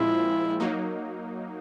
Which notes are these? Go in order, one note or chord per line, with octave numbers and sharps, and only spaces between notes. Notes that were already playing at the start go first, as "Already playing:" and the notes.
Already playing: A#2 F3 G#3 C4 E4 F4
F#3 A#3 D#4